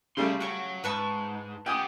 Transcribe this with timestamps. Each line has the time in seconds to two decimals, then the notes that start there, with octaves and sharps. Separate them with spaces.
0.17 C#3 G3 A3 D5 C6
0.40 F#4 C#5 G5 C#6
0.84 G#2 B4 A5 C#6
1.66 B3 G4 G5 G#5 D#6